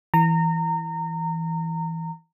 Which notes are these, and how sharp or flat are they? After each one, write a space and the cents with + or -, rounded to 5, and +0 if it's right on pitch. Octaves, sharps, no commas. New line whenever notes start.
E3 +0 A#5 -25